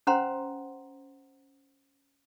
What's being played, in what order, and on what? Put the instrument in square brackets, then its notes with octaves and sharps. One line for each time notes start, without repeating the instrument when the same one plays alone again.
[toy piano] C#4 B4 C5 F#5 A#5 C6